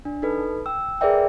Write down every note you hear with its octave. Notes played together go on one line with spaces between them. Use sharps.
D4
D#4 A4 B4
G5 E6
G#4 A#4 B4 D5 E5 G5